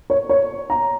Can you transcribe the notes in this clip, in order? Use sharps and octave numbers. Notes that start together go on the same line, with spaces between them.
C#5
C#5
A#5